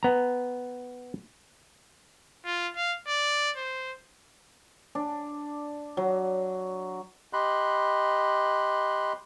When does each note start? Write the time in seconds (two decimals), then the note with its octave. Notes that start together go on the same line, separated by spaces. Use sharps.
0.03 B3 A#5
2.45 F4
2.77 F5
3.07 D5
3.57 C5
4.95 D4
5.97 F#3
7.33 G4 D#5 B5 C6 F#6